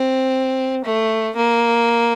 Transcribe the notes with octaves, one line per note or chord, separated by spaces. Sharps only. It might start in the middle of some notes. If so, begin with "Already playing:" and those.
Already playing: C4
A3
A#3